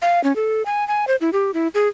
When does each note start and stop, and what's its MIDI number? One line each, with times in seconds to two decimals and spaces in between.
0.02 0.22 77
0.24 0.35 61
0.36 0.63 69
0.66 0.86 80
0.88 1.05 80
1.07 1.16 72
1.21 1.30 64
1.33 1.51 67
1.54 1.68 64
1.74 1.88 68